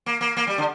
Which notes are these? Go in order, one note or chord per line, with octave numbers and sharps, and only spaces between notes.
A#3
A#3
A#3
G3
D3